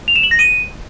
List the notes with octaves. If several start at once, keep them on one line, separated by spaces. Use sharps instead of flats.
F7
E7
F#7
A#6
D#7